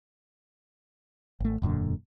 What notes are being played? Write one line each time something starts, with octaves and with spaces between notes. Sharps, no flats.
G#1 A3
E1 F#2 A#2 D3